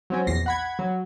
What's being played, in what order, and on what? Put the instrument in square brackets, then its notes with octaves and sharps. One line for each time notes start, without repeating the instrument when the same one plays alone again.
[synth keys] F#3 C4 C#4
A#1 E2 A#6 C7
F#5 B5 G#6
F#3